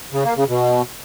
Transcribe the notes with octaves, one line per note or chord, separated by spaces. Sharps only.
C#3
A#3
C#3
B2